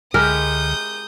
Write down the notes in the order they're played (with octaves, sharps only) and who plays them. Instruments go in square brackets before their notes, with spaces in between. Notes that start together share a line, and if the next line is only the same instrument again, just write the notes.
[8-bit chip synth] C#2 D3 [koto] G#3 E4 G4 [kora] A#4 [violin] D#6 G6